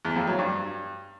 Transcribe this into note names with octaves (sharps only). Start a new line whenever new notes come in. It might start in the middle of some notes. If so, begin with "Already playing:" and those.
E2
F2
F#3
G2